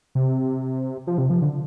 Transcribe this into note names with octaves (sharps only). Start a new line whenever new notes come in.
C3
F3
C3
F3
D3